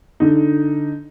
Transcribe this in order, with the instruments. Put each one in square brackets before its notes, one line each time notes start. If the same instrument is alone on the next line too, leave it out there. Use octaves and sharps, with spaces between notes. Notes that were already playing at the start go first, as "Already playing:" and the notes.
[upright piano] D3 D#4